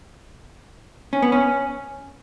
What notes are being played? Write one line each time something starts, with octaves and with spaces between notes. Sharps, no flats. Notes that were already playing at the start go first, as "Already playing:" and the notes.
C#4
B3
C#4